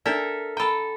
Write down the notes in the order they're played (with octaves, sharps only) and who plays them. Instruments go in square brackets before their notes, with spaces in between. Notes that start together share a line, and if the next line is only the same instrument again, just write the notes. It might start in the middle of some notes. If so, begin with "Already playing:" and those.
[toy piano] D4 D5 [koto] A4 A#4 E5
[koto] A4 G5 [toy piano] A#5 B5